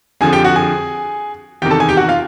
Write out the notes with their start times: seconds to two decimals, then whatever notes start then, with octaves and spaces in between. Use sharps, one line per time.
0.21 F2 D3 F3 G#4 G#5
0.33 G4 G5
0.44 F#4 F#5
0.56 G#4 G#5
1.62 E2 C3 D#3 G4 G5
1.71 A4 A5
1.80 G#4 G#5
1.89 G4 G5
1.97 F#4 F#5
2.08 F4 F5